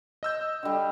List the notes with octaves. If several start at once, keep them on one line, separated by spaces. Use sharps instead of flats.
D#5 E6 G6
D3 G3